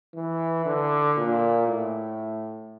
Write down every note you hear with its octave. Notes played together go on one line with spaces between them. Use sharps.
E3
D3
A#2
A2